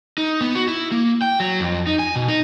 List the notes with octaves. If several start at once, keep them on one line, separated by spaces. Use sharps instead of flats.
D#4
B3
F#4
E4
A#3
G5
F#3
F2
D#4
G#5
B2
D#4